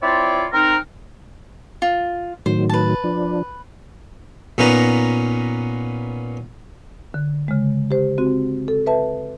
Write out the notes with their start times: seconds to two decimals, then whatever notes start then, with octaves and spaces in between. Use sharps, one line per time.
0.03 C4 E4 F4 C#5 D5
0.53 C4 D#4 A#4
1.82 F4
2.46 A2 D#3 F#3 C5
2.69 B4 A5
3.04 F3 D4
4.58 A#2 B3 C#4 D#4 B4 A#5
7.14 D3
7.48 C#3 G#3
7.91 G4 C5
8.18 C4 F#4
8.68 A4
8.86 B4 E5 A5